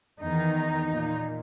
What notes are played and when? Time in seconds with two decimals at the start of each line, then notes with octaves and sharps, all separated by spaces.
0.23 E2 D#3 D#4
0.90 A#2